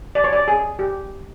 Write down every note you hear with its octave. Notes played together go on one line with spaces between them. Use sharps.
D5
C#5
D5
G#4
G4